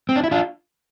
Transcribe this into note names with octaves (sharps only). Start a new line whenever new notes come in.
C4
D4
E4
D4 F4